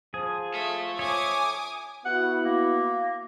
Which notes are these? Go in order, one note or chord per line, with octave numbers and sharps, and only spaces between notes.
F3 G#4
A4 E5
C#5 G#5 D6 D#6
B3 E4 F#4 F#5
A#3